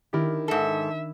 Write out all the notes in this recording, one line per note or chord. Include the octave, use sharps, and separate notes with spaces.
D#3 D4 E4 G4 A#4
G#2 A4 E5